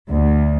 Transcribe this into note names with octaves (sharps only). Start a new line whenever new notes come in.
D2